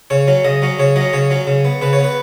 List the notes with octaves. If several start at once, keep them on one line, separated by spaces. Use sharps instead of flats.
C#3 C#5
F#3 C#4
C#3 D#5
F#3 C#4
C#3 C#5
F#3 C#4 D#5
C#3 C#5
F#3 C#4
C#3
B3
C#3 B4
C#5
B3
B4